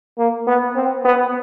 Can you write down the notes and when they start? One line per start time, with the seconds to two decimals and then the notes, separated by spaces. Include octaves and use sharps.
0.18 A#3
0.47 B3
0.76 C4
1.05 B3